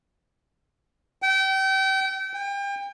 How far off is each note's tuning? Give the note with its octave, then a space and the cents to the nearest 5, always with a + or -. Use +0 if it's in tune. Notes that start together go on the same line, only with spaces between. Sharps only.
G5 -30
G5 +35